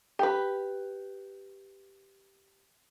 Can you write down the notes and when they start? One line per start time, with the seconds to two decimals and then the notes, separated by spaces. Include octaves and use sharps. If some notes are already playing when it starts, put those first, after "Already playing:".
0.19 G4 B4